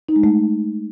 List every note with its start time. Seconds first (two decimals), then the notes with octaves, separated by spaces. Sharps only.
0.09 D#4
0.16 G#3
0.23 A3